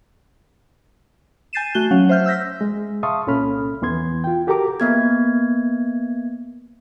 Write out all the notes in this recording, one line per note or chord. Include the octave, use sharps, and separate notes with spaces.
G#5 G6 A6 C7 D#7 E7
A3 F#4 F#6 G7
F#3 C#4 F5 F#5
C5 E5 F6 G6
E6 G6 A#6 B6
G#3
E5 F5 A5 C6 C#6 D#6
C2 A#2 C#4 A4 B5 F6
E2 E3 B3 C6 G#6
F4 G5
F#4 G4 A4 A#4 A#5 D6
A#3 B3 G#6